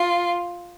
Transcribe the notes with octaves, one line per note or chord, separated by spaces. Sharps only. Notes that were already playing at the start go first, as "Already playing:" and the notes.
Already playing: F4